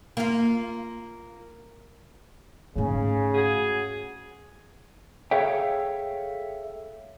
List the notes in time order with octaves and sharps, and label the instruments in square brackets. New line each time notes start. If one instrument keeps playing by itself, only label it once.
[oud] A#3 F4
[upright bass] G#2 A3 [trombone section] C#3
[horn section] F#4 G#4
[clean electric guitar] G#4 A4 C#5 E5 F5 G5